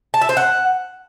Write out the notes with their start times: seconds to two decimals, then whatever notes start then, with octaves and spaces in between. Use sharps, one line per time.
0.14 A5
0.21 E5
0.29 C5
0.37 F#5